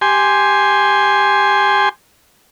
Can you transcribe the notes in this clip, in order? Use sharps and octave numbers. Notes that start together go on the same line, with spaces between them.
G4 G#5 C6